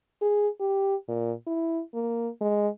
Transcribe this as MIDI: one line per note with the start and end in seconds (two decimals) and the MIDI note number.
0.22 0.48 68
0.60 0.95 67
1.08 1.33 46
1.47 1.82 64
1.94 2.29 58
2.41 2.68 56